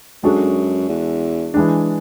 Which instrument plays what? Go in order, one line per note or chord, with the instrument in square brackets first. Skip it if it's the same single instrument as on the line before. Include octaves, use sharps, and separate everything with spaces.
[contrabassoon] F#2 [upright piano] G#3 D4 F#4 A4
[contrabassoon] E2
[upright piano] E3 G#3 D4